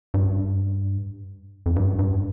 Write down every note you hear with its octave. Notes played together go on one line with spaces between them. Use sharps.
G2
F2
G2
G2